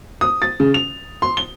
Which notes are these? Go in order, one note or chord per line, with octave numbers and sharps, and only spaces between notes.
D#6
A6
C#3
F7
C6
G7